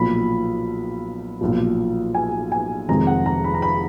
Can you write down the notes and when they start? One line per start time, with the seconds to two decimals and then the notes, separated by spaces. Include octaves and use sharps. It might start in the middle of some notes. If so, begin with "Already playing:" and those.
Already playing: B1 A#2 F3 B5
1.41 B1 A#2 F3
2.15 G#5
2.52 G#5
2.88 F1 F2 D#3 G#3 A#5
3.07 F#5
3.26 A#5
3.44 B5
3.54 A#5
3.62 B5